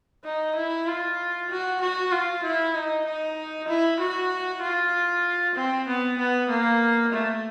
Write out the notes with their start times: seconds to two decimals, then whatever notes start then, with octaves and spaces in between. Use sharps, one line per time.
0.25 D#4
0.55 E4
0.87 F4
1.50 F#4
1.81 F#4
2.12 F4
2.44 E4
2.74 D#4
3.05 D#4
3.68 E4
4.00 F#4
4.62 F4
5.55 C4
5.88 B3
6.18 B3
6.50 A#3
7.12 A3